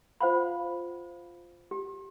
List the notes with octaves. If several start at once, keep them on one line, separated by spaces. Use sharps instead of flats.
F4 C5 F5 F#5 B5
G4